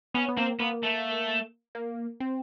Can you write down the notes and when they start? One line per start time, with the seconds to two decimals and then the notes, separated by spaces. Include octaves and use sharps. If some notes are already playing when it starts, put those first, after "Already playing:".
0.14 B3 C#4
0.28 B3
0.37 A#3 C4
0.60 A#3 B3
0.83 A3
1.75 A#3
2.20 C4